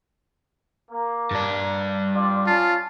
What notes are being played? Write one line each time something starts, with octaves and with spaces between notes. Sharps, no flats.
A#3
G2 D4
C4 F4 D5
C#4 F4 A5